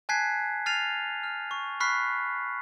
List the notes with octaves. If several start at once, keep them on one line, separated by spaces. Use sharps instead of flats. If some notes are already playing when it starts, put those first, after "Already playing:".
G#5 A5 F#6 G#6 B6 C7
F6 A6 C7 D#7 F7
F6
C#6
B5 C#6 F6 F#6 B6 C7